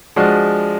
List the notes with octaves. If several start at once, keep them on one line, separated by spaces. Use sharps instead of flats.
F3 G#3 D4 F#4